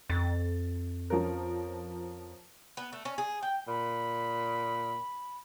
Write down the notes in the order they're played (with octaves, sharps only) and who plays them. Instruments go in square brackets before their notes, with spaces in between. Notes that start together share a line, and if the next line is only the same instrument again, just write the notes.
[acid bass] F2 [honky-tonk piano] A6
[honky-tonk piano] F3 C#4 A#4
[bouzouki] B3
A3
C#4
G#4
G5
[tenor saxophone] A#2 [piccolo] B5